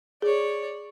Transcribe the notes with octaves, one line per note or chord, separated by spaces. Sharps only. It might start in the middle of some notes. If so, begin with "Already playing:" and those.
G#4 C#5 D5